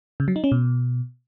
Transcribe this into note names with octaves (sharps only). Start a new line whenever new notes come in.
C#3
F#3
D#4
C#4
B2